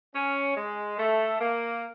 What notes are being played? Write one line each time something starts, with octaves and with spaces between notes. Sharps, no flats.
C#4
G#3
A3
A#3